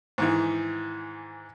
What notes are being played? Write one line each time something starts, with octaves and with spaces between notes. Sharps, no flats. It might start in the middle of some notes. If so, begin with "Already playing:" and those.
G#2 D#3 E3